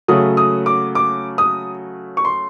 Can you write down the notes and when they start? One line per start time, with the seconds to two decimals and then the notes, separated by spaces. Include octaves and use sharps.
0.08 C#3 F#3 A3 D#6
0.37 D#6
0.66 D6
0.95 D6
1.38 D#6
2.17 C#6
2.25 C6